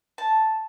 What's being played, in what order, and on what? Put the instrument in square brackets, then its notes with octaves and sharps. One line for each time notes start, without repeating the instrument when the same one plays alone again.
[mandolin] A5